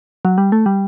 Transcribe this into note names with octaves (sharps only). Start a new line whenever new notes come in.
F#3
G3
A3
G3